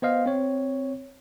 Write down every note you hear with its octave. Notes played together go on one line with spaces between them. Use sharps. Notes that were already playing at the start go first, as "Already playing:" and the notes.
B3 C5 D#5 F5
C4 C#5